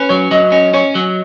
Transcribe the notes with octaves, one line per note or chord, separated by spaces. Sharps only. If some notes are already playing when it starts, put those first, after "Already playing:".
Already playing: C#4 B4
F#3 C#5
F#3 D#5
C#4 D#5
C#4 C#5
F#3